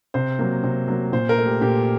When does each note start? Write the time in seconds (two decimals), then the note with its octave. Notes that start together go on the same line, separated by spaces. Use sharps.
0.14 C3 C5
0.39 F#3 A#3
0.64 C3
0.88 F#3 A#3
1.12 A#2 C5
1.29 A#4
1.38 A3
1.46 G4
1.61 A#2 G4